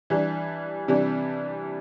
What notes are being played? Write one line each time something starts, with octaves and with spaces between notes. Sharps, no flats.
E3 G3 D4
C3 E3 G3 D4